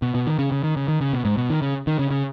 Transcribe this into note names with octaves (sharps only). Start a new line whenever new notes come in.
B2
B2
D#3
C#3
C#3
D#3
C#3
D#3
C#3
B2
G#2
B2
D#3
C#3
D#3
C#3
C#3